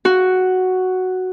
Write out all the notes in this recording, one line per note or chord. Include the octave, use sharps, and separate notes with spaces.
F#4